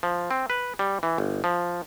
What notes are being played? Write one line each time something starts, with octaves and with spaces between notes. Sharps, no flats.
F3
C4
B4
G3
E3
G1
F3